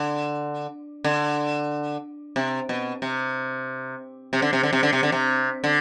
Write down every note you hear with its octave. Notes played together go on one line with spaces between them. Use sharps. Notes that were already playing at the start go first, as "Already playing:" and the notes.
Already playing: D3
D3
C3
B2
C3
C3
D3
C3
D3
C3
D3
C3
D3
C3
D3